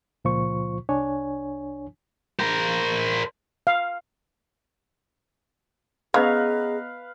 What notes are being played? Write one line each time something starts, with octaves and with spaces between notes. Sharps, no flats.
C#2 A#2 F3 F4 C5 C#6
C2 D4 C#5 G#5
A#4 C5
F5
C#3 B3 G#4 B4 D#5 F5 A#5